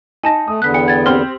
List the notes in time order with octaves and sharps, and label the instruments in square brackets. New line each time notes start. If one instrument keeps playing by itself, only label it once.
[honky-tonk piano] D#4 [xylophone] G#5 A5 A#6
[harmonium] A3 [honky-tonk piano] D#6
[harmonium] E2 D3 B3 [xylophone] F#6 B6
[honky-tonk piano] G5 [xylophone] C#7
[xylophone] G#6 A6
[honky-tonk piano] C4 G4 [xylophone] F6 G7